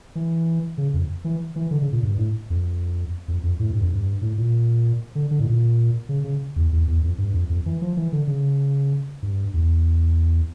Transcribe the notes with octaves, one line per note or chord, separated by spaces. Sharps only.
E3
C#3
F2
E3
E3
D3
C#3
A#2
G2
A2
F2
F2
F2
A2
G2
F2
G2
A2
A#2
D3
D3
A2
A#2
C#3
C#3
E2
E2
E2
F2
G2
F2
F2
E3
F3
E3
D3
C#3
G2
E2